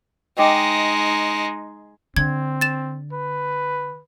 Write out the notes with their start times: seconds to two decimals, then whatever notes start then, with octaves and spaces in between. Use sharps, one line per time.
0.38 G#3 D#4 D#5 G5 D6
2.16 D3 C4 G#6
2.61 A6 E7
3.13 B4